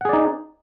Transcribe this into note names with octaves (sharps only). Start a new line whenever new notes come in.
D#4 G#4 D5 F#5